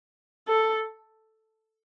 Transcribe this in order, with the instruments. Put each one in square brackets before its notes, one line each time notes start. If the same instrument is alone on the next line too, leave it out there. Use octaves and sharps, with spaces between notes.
[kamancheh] A4